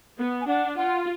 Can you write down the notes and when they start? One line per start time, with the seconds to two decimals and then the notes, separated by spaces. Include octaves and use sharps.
0.19 B3
0.41 G#5
0.47 D4 F#5
0.76 F4 F#5